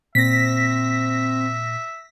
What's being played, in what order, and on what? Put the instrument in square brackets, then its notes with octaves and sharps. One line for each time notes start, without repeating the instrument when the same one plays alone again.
[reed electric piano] A#2 [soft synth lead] C4 [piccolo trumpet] E5 [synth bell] A#6 B6